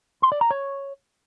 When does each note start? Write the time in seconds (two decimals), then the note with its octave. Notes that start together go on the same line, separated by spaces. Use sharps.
0.22 C6
0.32 D5
0.41 A#5
0.51 C#5